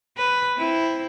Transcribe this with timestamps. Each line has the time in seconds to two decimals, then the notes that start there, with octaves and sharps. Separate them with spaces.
0.18 B4
0.57 C4 E4